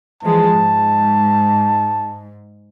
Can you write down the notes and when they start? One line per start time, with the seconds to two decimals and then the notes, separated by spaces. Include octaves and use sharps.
0.23 E3 F3 G#3 A5
0.53 G#2